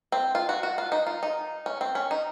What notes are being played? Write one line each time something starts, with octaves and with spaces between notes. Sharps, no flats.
C4
F4
F#4
F#4
F4
D#4
F4
D#4
C#4
C4
C#4
D#4